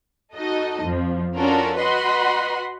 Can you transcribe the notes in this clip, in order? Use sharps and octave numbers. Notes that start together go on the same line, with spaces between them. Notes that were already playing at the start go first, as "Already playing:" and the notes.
D#4 F#4 A4 D#5
F2 F3
C#4 D4 F4 F#4 A4 A#4
F#4 B4 D#5 F#5 B5 C6